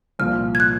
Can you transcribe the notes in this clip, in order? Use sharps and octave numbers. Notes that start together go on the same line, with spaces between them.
C2 A#2 F3 A#3 F4 F6
G#6
F#6